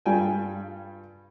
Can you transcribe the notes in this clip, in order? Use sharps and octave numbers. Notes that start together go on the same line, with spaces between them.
G2 G3 F4 D5 G5 G#5